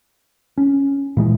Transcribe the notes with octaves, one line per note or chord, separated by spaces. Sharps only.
C#4
A#2 E3 G#3